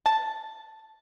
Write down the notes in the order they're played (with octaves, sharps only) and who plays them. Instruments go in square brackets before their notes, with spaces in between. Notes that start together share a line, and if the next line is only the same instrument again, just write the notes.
[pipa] A5